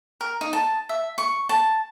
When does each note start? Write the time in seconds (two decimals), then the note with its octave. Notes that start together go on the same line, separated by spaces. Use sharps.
0.21 A#4
0.41 D#4
0.53 A5
0.89 E5
1.18 C#6
1.49 A5